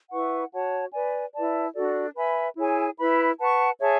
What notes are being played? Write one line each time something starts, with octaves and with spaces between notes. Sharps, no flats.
E4 B4 F#5 C#6
F#4 C#5 F#5 A5
B4 D5 G#5
E4 B4 D5 A5
D4 F#4 A4 D5
B4 E5 G#5 B5
E4 G#4 C#5 G#5
E4 B4 E5 B5
B4 F#5 A5 C#6
G#4 C#5 E5 A5